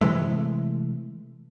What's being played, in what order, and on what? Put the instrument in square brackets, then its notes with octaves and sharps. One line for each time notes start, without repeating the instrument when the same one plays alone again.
[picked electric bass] C3 E3 G#3 A3